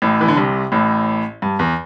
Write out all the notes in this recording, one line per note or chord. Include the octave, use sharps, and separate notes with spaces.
A1 A2
E3
D3
C2 C3
A1 A2
G2
E2